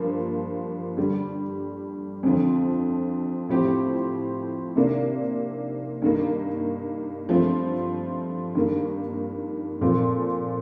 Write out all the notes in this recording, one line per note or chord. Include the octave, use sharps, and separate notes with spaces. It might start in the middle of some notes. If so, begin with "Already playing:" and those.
Already playing: G2 F3 A#3
G2 D3 G3
F2 D3 F3
A2 F3 C4 G4
C3 D#3 A#3 D4
G2 D#3 A#3 D#4
G2 F3 A3 C4 F4
G2 D#3 A#3
A#2 F3 C4 F4 A4